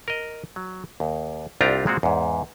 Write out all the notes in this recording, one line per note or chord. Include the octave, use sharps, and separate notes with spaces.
A#4 D#5
F#3
D#2
C2 C4 D4 F4 G4 A#5
A#2 G#3 C4 F#4
E2 G#2